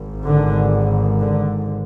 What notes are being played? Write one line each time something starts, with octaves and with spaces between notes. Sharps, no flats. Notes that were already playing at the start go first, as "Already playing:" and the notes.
Already playing: G#1 G#2
D3
D3